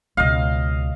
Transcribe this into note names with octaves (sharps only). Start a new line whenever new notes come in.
C#2 B2 D#5 F5